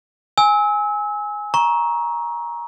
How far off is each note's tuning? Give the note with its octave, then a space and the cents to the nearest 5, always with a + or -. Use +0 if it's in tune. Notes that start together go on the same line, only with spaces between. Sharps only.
G#5 +0 E6 -30
A#5 +15 C#6 +0